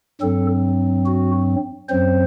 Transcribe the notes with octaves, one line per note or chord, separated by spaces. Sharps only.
G2 F#3 C4 A4
F#4
F#2 F#3 C4 C5